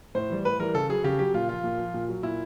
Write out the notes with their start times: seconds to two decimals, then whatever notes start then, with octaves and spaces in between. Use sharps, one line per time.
0.15 A2 C5
0.30 E3 G3
0.45 A2 B4
0.59 E3 G3 A#4
0.74 C#3 A4
0.89 F#3 G#4
1.04 C#3 G4
1.19 F#3 G4
1.34 A#2 F4
1.49 F3 F4
1.64 A#2
1.78 F3
1.94 A#2
2.09 F#3
2.23 A#2 E4